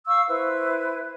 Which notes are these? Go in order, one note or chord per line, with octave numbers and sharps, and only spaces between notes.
F5 C#6 E6
E4 B4 C5